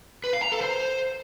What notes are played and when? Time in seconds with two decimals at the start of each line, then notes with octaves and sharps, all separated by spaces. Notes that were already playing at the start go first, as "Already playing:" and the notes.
0.24 B4
0.33 F5
0.42 A#5
0.52 A4
0.61 C5